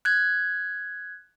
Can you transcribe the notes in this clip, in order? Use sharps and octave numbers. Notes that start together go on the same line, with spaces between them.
F#6 G#6